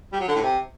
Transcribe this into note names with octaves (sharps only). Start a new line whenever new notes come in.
G3
F#3
D3
A2
C3